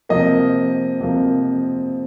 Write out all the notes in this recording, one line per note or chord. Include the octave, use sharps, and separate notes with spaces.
F2 C3 F3 A#3 D#5
F2 C3 F3 A#3